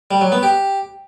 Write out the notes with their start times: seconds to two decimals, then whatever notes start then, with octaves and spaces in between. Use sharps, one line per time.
0.11 G3
0.21 F#3
0.32 B3
0.43 G4